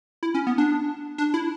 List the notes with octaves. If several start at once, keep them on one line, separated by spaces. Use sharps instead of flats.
E4
C#4
B3
D4
D4
E4